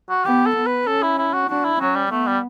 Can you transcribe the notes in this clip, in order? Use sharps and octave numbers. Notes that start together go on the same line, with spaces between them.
F#4
B3 G4
A4
B3
B4
C#4 A4
E4
E4
F#4
D4 F#4
E4
F#3 C#4
G3
A3 B3
G3